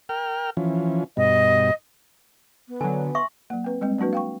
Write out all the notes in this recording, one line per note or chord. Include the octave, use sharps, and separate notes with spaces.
A#4 G5 F6
E3 F3 C#4
G2 B2 D#5
B3
D3 F#3 G#5
E5 C6 C#6
F#3 A#3
C4 B4
G3 G#3 C4
F#3 A#3 D4 F#4 B4
F5 G5 C#6